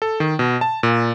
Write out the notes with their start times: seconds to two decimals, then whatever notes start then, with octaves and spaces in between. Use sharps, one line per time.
0.02 A4
0.20 D#3
0.39 B2
0.61 A5
0.83 A#2